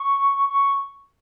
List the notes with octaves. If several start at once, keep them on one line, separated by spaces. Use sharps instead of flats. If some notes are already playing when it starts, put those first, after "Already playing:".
Already playing: C#6
C#6